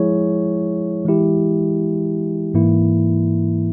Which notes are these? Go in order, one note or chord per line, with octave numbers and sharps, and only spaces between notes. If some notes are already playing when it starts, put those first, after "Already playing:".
Already playing: F3 G#3 E4 G#4 C#5
E3 G#3 E4 G4
G#2 E3 A#3 E4